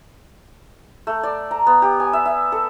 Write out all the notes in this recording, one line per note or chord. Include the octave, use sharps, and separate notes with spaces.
A3
D5
A#5
B3
G4
G#5
E5
E5
A4